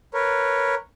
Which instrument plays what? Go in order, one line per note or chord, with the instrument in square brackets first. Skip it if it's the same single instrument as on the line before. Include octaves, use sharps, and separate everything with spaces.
[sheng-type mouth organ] A#4 B4 C#5